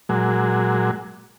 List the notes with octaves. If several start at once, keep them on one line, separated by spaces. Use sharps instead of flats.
A#2 F#3 G#3